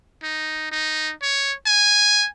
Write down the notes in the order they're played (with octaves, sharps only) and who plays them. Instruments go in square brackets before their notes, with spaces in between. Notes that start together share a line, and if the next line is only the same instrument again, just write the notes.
[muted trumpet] D#4
D#4
C#5
G#5